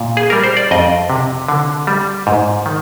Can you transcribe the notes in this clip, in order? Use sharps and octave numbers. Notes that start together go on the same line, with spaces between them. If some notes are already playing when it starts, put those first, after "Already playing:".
Already playing: A#2
G#4
G3 A#4
C5
D5
F2 D#5
C3
D3
G3
G#2
D#3